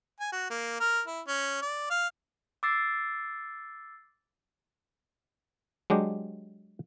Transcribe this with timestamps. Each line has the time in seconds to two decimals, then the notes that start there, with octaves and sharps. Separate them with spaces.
0.20 G#5
0.32 F#4
0.50 A#3
0.80 A#4
1.07 E4
1.28 C#4
1.62 D5
1.90 F5
2.63 D6 E6 A6 C7
5.90 F#3 G#3 D4 G4